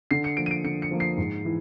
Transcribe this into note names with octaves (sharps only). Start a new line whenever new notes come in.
D3 C7
C#7
F3 A#3 D7
D#7
D7
D3 C#7
C#7
F3 A#3
C7
G#2
E3